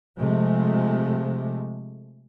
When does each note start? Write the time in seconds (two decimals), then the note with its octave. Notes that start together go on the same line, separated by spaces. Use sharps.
0.18 C3 F3 G#3 A3